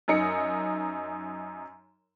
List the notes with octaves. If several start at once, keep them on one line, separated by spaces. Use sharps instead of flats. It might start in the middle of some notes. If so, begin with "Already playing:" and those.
F#2 D#4 C#7